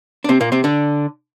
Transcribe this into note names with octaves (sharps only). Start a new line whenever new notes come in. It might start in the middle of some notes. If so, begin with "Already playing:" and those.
D4
C3 C4
A#2 A#3
C3 C4
D3 D4